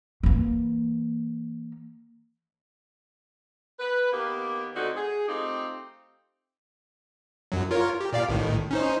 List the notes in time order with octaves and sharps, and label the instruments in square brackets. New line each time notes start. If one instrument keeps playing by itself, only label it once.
[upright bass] E3 A#3
[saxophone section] B4
D#3 A#3 B3 G4
D2 D3 C4 D#4 F#4
G#4
A3 C4 D#4 F4 G4
[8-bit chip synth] F#2 F#3
F4 A#4 C#5
G4
A#2 D5 F5
A1 A2 D#3
C#4 D#4 C5